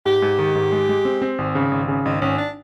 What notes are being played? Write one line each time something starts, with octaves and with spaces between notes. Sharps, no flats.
G#2 G4
G#2
D#3
G#2
G#3
G#3
C4
C4
G#1
C#3
G#1
C#3
G#1 D#4
G#1 C#4
D4